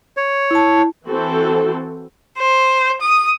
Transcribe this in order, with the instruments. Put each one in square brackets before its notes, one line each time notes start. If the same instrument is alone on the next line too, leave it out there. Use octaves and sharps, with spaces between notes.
[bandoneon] C#5
[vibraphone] E4 A5
[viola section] E3 C4 F#4 A4
[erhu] C5
D#6